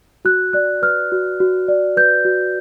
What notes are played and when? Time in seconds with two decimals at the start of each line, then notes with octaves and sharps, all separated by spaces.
0.25 F#4 F#6
0.53 D5 F#6
0.82 B4 F6
1.12 F#4
1.40 F#4
1.68 D5
1.97 B4 G6
2.25 F#4